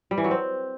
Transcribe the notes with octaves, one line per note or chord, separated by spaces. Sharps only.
G3
E3
F#3
C4